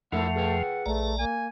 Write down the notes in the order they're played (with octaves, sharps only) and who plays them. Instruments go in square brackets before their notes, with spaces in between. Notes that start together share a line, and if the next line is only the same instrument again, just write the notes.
[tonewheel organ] F2 F3 [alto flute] A3 [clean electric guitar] E4 A4 A#4 [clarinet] F#5
[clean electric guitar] G#4 B4 G5
[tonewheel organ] A#1 D5 A#5 [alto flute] A3
[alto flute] A#3 [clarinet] G#5